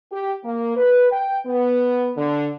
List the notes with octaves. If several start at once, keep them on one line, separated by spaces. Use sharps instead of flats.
G4
A#3
B4
G5
B3
D3